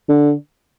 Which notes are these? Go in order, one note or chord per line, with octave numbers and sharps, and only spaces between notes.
D3